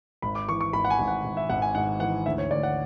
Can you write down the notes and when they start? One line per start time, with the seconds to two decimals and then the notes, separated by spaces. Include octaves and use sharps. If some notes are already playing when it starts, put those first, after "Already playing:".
0.22 G#1 B5
0.35 D6
0.49 E3 C#6
0.60 C#6
0.73 G#1 B5
0.85 F#5
0.90 G#5
0.99 G#1
1.08 F#5
1.24 G#1
1.37 E5
1.49 G#1 F#5
1.62 G#5
1.75 G#2 F#5
2.00 E3 F#5
2.26 D2 E5
2.38 C#5
2.51 D2 D5
2.63 F#5